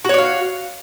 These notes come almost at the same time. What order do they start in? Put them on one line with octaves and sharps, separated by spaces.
F#4 C#5 D5 F5